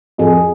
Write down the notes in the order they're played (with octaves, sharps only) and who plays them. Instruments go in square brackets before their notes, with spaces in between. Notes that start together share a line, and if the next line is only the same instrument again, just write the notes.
[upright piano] F2 [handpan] G#4